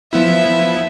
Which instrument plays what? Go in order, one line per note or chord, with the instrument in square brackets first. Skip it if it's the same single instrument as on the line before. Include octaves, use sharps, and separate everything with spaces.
[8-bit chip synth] F3 B3 E4 [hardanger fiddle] E5